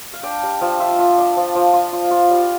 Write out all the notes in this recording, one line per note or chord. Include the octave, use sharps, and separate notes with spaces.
F5
D4 G5
G3
F3 F5
F4 E5
F4
D4
F3
F3
F4
F4
F4 F5
G3